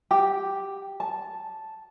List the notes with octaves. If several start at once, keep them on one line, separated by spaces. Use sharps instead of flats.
G4
A5